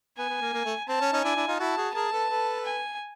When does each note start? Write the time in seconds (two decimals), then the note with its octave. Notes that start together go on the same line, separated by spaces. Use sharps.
0.18 B3 G#5
0.29 B3
0.41 A#3
0.54 A#3
0.65 A3
0.89 C4 A5
1.01 C#4
1.13 C#4 D#4
1.24 D4 E4 G#5
1.36 D4 E4
1.48 D#4 F4
1.60 E4 F#4 A5
1.77 F#4 G#4
1.95 G#4 A#4 A5
2.12 A4 B4
2.30 A4 B4
2.65 G#5